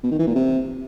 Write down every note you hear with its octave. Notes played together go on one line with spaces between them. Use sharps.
B2
D#3
E3
A#2
C3